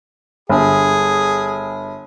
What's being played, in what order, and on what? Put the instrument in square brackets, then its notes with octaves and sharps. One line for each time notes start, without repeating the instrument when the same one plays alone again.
[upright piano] G1 [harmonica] G#4